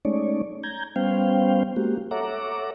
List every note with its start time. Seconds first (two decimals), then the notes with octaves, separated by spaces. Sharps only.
0.05 G#3 A3 C#4 D#4 C#5 D5
0.63 A#5 G6 G#6
0.96 G3 B3 C#4 C5 F5 G5
1.76 G#3 A#3 F#4 G4
2.11 A4 C#5 E5 F#5 A#5 D6